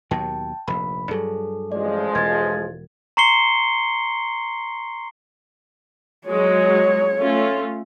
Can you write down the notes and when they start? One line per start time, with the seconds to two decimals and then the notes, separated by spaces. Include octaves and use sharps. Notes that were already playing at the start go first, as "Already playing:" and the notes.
0.11 D#2 B2 F#3 G5 A5
0.68 F1 A#1 B5
1.11 G2 F#3 G#4 A4
1.72 A1 F3 G#3 D5
2.15 E1 G#6 A6
3.17 A#5 C6 C#6 C7 C#7 G7
6.28 F#3 G#3 C#5
7.19 A3 C#4 F4